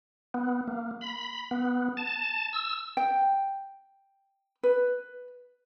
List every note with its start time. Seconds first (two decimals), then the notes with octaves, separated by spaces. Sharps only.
0.34 B3
0.68 A#3
1.01 B5
1.51 B3
1.97 A5
2.53 E6
2.97 G5
4.63 B4